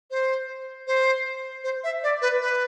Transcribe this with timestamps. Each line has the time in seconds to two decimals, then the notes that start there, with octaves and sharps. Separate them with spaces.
0.11 C5
0.87 C5
1.64 C5
1.84 E5
2.03 D5
2.22 B4
2.41 B4